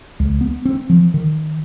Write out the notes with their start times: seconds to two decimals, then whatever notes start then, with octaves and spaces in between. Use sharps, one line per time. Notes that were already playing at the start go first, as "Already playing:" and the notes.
0.20 C#2
0.41 B3
0.65 C4
0.90 F3
1.14 D#3